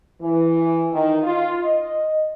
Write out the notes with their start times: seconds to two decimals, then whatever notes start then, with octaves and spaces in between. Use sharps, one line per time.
0.21 E3
0.93 D#3
1.24 F4
1.62 D#5